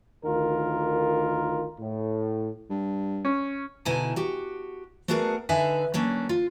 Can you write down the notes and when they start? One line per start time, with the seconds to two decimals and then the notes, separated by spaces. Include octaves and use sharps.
0.24 D2 D#3 F4 A#4
1.80 A2
2.70 G2
3.25 C#4
3.85 B2 D3 D#4 E4 G#5 A5
4.16 F#4 G4
5.08 A3 B3 D4 F#4 G#4 A#4
5.49 D3 D4 D#4 B4 E5 G#5
5.94 F#3 A#3 C#4 D4
6.29 F4